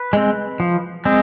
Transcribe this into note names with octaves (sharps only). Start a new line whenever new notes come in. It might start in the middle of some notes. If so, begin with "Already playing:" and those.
Already playing: B4
G#3 C4
F3
G#3 C4